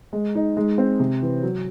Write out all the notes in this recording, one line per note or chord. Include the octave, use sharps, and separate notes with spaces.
G#3
D#4
G#3
C4
C3
E3
F#3